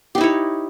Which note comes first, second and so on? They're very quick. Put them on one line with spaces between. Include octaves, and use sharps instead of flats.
G4 D#4 E4 C#5